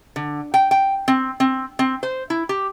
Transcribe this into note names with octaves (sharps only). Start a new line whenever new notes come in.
D3
G5
G5
C4
C4
C4
C5
E4
G4